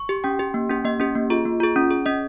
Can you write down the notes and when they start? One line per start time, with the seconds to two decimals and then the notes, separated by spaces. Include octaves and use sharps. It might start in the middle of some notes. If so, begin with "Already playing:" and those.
Already playing: C#6
0.09 G4
0.24 C#4 G5
0.39 G4
0.54 A#3
0.69 C#4 G4
0.84 A#3 D#5
1.00 C#4 G4
1.15 A#3
1.30 F4 G#4
1.45 A#3
1.60 F4 G#4
1.76 C#4
1.91 G#4
2.06 C#4 D#5